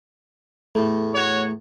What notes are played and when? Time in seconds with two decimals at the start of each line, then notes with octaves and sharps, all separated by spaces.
0.75 E2 A2 A3
1.14 F#4 C#5